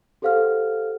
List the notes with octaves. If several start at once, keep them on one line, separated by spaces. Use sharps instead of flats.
G4 A4 C5 F5 F#5 F6